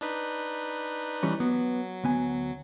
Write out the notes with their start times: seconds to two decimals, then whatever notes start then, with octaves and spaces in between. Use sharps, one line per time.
0.01 D4 D#4 B4
1.23 E3 G3 C#4
1.40 F#3 B3
2.04 D2 B3 G#5